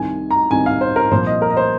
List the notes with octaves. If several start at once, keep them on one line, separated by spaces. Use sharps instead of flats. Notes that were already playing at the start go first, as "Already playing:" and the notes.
Already playing: C2 C3 D#3 G#5
A#5
C2 C3 D#3 G#5
F5
C5
A#4
C2 A#2 F3 C5
D#5
A#4
D#5
C5